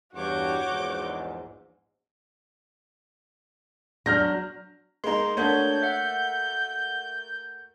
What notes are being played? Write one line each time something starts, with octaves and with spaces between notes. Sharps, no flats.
E2 G2 F#4 C#5 D6 G6
A#1 E2 G#2
F#3 D4 F6 G6 A#6
G#3 A#3 D#4 A#5 C6
A3 A#3 D4 F#4 C#5 G6
E5 F#5